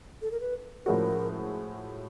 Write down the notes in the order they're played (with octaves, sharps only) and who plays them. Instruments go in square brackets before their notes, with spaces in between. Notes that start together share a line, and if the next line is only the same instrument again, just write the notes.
[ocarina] A4
A#4
B4
[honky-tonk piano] A2 F3 G#3 C#4 F#4 [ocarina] A#4